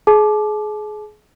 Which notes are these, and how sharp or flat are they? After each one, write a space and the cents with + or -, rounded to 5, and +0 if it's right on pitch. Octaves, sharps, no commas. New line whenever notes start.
G#4 +30 A5 -35 D6 +10